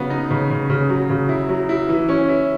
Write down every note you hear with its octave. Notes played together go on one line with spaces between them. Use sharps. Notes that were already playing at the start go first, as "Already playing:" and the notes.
Already playing: C#3 F#3 B3
D#4
C#3
C#3
C#3
F#3
C#3
E4
F#3
E4
E3
C#4
E4